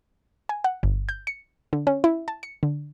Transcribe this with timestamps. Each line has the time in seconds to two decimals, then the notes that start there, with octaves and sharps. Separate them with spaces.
0.49 G#5
0.64 F#5
0.83 G1
1.09 G6
1.27 C#7
1.73 D3
1.87 C#4
2.04 E4
2.28 A5
2.43 C#7
2.63 D3